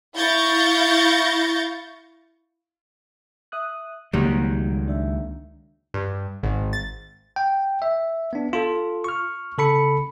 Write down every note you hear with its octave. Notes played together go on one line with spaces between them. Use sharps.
E4 F5 C#6 G6 A6 A#6
E5 D#6 F#6
C#2 D#3 F#3 G3 A#3
D4 E5
G2
G#1
A6
G5
E5
B3 D4
F4 A4
C#6 F6
C#3 A4 B5 C#7